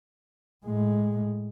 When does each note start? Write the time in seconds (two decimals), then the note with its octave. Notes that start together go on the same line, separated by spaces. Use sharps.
0.65 A2 G#3